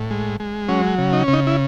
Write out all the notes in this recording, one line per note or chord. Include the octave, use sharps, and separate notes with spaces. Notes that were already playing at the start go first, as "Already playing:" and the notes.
Already playing: A2
G#3
G#3
F#3 C#4
C#3
D#4
C#3 C#4
D#4
E4